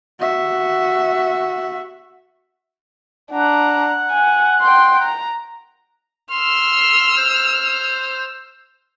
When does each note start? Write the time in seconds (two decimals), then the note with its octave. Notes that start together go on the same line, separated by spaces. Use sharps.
0.19 F#4 E5
3.31 D4 F#5 A#5
4.10 G#5
4.61 G5 C6
5.03 A#5
6.31 C6 E6 F6
7.18 C5